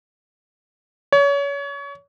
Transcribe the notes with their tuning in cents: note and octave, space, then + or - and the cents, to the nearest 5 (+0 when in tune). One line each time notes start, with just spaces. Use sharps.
C#5 +30